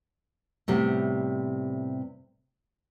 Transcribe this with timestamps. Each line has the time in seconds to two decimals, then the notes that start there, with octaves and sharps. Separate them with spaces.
0.68 A2 C3 G3 B3